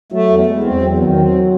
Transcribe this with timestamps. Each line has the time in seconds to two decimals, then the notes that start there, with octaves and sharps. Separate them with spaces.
0.12 F#3 A3
0.30 E2
0.46 E2 G#3
0.64 C4
0.81 E2 F#3
0.98 D#3
1.17 C4